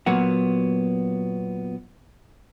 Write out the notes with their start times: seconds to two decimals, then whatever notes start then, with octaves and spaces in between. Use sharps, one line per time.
0.06 A#2 F#3 A#3 B3 F#4